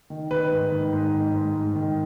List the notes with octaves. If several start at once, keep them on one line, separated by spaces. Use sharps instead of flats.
D#3
D#3 B4
G#2
D#3
G#2
D#3
G#2
G#2
D#3